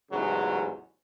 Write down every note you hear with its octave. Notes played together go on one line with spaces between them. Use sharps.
A1 E2 G#2 C#3 F#3